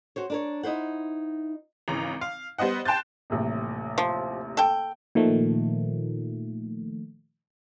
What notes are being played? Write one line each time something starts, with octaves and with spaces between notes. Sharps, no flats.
F#4 C5 C#5
D4 A#4 C#5
D#4 E4 C5 F#5
G#1 C#3 E3 A#5
F5
G3 B3 C5 D#5 F#5
G5 A5 C6 F#6 G6 A6
D#1 A1 C3
F3
A4 G5
A#2 D#3 F3 A3